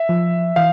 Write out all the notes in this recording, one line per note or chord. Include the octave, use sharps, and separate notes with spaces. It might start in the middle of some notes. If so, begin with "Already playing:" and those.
Already playing: E5
F3
E3 F5